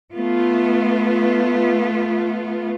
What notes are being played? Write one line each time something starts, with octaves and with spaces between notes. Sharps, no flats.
A3 B3 F4